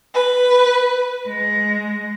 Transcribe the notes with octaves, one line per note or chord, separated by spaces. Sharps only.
B4
G#3